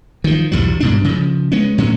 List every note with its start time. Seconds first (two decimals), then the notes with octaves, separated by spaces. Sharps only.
0.24 D#3 F3
0.52 B1 E2 G2 F#3
0.80 G2 B2 D4
1.04 C#3 F3
1.52 G#3 B3 C#4
1.78 A2 F#3 C#4